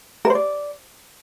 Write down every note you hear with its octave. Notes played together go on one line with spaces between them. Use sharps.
A#4
C5
D5